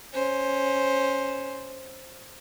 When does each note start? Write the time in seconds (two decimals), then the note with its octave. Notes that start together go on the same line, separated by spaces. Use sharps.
0.14 C#4 C5